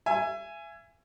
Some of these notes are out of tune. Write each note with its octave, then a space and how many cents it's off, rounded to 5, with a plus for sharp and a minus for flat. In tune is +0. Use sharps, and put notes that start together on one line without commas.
E5 +35 G#5 +0